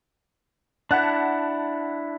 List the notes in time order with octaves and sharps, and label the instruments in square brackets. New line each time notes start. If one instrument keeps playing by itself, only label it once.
[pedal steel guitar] D4 E4 [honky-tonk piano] F#5 A5 F#6